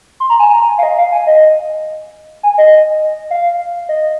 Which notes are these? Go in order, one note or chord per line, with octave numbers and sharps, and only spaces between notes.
C6
A#5
G#5
A#5
G#5
F5
D#5
F5
G#5
D#5
G#5
D#5
F5
D#5